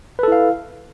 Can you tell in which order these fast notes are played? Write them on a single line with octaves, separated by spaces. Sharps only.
B4 A4 E4 F5